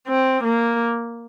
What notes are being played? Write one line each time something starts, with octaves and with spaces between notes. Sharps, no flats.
C4
A#3